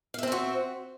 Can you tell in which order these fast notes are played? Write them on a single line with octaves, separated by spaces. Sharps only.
F5 E5 C4 C5 F#4